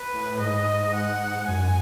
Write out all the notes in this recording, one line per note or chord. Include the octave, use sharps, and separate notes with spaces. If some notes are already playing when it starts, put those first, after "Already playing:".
Already playing: B4
A2
G#2 D#5
F#5
F#2 G#5